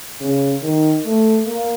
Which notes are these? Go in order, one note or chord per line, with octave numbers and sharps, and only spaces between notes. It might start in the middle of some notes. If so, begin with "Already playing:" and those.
C#3
D#3
A3
A#3